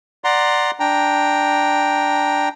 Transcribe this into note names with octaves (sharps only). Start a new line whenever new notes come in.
D5 F#5 A#5 C6
D4 G5 A#5